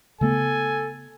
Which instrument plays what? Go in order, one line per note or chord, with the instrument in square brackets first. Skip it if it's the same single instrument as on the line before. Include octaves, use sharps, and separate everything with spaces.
[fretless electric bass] C#3 A3 B3 [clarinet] A4 [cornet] G#5